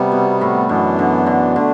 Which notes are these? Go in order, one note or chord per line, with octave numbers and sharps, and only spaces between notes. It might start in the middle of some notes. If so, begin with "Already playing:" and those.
Already playing: C3 G3 B3
B2
A2
F#2 B2 E3 B3 D4
D3
D3
D3 A3 D4